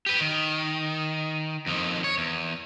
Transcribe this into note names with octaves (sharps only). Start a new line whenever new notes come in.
G4 B4
D#3
F2 D#3
C#5
E2